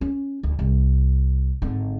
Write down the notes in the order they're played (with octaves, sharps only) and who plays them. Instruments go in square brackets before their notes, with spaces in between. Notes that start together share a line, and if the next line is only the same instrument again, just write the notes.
[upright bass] C#4
D2
C2
G#1 D3